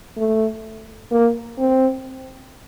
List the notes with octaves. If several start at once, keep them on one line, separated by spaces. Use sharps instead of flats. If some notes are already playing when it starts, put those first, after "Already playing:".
A3
A#3
C4